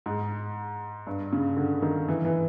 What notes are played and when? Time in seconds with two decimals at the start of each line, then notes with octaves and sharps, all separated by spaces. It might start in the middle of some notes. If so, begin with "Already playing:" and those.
0.06 G#2
1.07 G2
1.33 C#3
1.57 D3
1.82 D#3
2.08 E3
2.25 E3